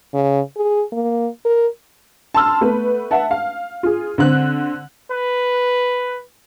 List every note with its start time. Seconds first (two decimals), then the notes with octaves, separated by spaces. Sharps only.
0.14 C#3
0.56 G#4
0.92 A#3
1.45 A#4
2.34 A5 C6 E6 F6
2.61 A3 B3 B4
3.11 E5 F#5 A5
3.31 F5
3.83 F4 G#4
4.18 D3 C4 F#6
5.11 B4